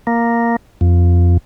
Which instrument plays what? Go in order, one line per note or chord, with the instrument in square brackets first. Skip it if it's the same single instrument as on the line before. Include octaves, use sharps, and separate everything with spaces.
[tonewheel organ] A#3
F2